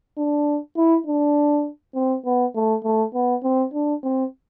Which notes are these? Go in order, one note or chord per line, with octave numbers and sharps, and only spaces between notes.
D4
E4
D4
C4
B3
A3
A3
B3
C4
D4
C4